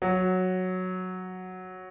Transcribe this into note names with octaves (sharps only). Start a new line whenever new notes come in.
F#3